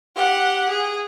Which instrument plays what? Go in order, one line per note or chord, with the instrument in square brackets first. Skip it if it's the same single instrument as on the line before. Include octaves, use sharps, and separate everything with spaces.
[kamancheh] G4 F#5
G#4